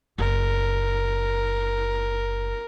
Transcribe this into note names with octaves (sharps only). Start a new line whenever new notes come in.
F#1 A#4